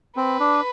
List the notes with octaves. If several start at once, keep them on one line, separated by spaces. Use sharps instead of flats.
C4 B4
D4